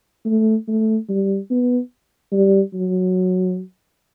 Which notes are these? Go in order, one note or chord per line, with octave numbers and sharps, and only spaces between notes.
A3
A3
G3
B3
G3
F#3